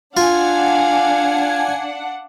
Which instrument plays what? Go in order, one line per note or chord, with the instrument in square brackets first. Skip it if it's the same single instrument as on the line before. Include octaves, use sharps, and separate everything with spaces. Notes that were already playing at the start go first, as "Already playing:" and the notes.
[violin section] D4 F#5 [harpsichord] F4 [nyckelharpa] F5 [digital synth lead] G#5